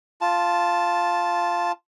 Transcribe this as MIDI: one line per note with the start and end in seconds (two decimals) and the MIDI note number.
0.21 1.72 65
0.21 1.72 81